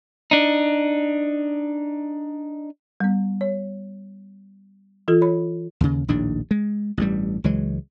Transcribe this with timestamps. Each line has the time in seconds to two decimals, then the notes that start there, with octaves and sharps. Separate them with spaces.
0.31 D4 D#4
3.00 G3 B3
3.41 C#5
5.08 E3 F4 A4
5.21 C#5 B5
5.81 D#2 C#3
6.08 A#1 D#2 A2 D4
6.51 G#3
6.97 A1 G2 G3
7.44 C#2 E3 F#3 G#3